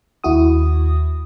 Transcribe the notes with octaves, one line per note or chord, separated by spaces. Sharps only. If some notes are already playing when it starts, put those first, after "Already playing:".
D#2 E4 F#4 D#6